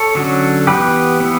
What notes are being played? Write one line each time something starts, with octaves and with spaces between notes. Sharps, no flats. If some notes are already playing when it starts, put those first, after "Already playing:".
Already playing: A4 C#5
D3 F#3 C#4
E3 B3 G4 B4
E3 B3